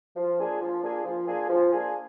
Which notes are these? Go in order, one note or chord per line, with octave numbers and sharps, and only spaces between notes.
F3
A#3 D4 F4 G#4
F3
A#3 D4 F4 G#4
F3
A#3 D4 F4 G#4
F3
A#3 D4 F4 G#4